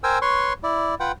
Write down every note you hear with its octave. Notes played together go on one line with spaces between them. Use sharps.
A#4 C5 G5 G#5 E6
B4 C#5 C6 C#6
E4 D5
F4 B4 F#5 G5